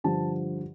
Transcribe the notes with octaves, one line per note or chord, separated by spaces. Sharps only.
G2 D3 F3 A5